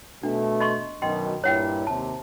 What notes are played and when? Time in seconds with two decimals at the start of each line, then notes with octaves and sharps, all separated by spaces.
0.23 B2 A3 D4
0.60 D#5 C6 C#6
1.02 F#2 B2 D#3 D#5 G5 C6
1.44 G2 A#2 E4 C#5 F#5 G5
1.87 D#2 C3 A5